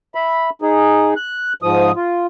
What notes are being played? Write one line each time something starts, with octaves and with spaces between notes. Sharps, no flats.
E5 B5
D#4 G#4
F#6
G#2 F3 D#6
F4